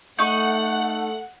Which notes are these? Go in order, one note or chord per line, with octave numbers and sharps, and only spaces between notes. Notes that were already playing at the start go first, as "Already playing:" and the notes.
A3 D#4 F#5 C#6